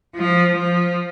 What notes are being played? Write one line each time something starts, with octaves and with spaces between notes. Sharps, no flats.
F3
F3